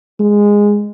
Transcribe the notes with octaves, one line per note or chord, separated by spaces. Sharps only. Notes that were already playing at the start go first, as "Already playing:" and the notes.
G#3